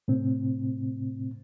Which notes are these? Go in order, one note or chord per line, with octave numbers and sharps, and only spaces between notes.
A2 C3 C4